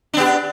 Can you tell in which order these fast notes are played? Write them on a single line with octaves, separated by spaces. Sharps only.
D4 B3 G4